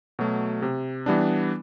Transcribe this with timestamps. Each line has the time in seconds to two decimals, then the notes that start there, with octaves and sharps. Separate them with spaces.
0.19 B2 F#3 A3
0.62 C3
1.06 E3 G3 B3 D4